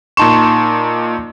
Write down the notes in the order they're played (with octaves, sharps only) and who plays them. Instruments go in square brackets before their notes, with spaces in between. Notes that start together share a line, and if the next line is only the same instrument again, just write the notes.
[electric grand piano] A#2 D#4 E7 [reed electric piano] A5 C6 C#6